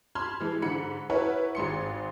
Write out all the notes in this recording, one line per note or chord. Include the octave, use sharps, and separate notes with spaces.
A5 B5 C6 F6 G#6
E3 G#3
G#2 D3 B5 C#7
E4 A#4 B4 C#5 F#5
G#1 G#3 C6 C#7